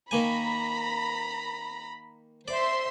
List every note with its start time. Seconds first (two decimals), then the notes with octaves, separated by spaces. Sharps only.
0.11 D#3 A#3 G#5 A#5 B5
2.48 C5 D5 E5 C6